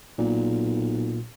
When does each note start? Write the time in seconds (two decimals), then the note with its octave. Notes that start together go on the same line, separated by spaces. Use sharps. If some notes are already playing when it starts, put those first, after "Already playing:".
0.18 B1 A#2